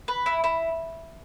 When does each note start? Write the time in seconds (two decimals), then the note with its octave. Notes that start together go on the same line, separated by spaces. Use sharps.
0.08 B4
0.26 E4
0.44 E4